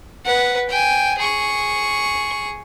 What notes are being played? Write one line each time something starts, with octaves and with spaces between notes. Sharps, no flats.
B4 F#5
G5 G#5
G#4 C#6